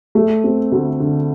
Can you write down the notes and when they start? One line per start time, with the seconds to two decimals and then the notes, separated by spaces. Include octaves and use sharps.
0.15 A3
0.44 C4
0.72 D2
1.00 D3